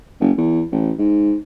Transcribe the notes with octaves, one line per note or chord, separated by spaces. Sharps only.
F#1
E2
A1
G#2